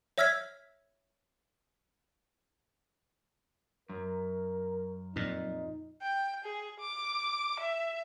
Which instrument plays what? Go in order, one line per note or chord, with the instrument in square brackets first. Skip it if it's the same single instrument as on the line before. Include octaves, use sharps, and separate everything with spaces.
[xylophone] C#5 E5 E6 F6 G#6 B6
[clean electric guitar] F#2 [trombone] A#4
[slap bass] F2 A#2 [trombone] D#4
[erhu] G5
G#4
D6
E5